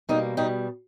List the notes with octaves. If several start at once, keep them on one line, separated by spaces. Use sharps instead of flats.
B2 G3 A#3 D#4
B2 G3 D#4